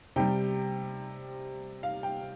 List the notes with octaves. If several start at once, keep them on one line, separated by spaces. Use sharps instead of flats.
C3 G3 G5
F5
G5